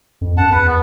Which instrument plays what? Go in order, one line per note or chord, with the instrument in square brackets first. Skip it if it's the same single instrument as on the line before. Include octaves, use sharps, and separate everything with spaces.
[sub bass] F2
[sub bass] F#2 [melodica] F#5 A5
[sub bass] E2 [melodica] B4 F#5
[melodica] B3